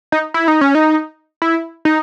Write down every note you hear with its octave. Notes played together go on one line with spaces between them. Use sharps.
D#4
E4
D#4
C#4
D#4
E4
D#4